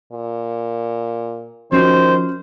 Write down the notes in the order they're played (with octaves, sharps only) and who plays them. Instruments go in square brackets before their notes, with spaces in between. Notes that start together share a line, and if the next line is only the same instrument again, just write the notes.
[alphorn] A#2
[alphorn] D#3 [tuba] F3 [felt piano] C#4 F#4 [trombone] C5